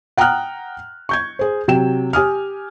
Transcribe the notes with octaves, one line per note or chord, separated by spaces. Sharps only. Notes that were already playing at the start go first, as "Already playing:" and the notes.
F#5 G5 A#5 D#6 F6 F#6
C#6 G6 G#6
G#4 C5
C3 F#3 G5 E7
G4 G#5 D#6 F6